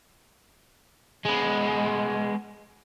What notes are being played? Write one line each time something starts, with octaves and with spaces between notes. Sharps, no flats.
G#3 B3